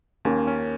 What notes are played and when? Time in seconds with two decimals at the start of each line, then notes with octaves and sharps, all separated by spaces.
0.25 D#2 A#3 C#4
0.47 C#4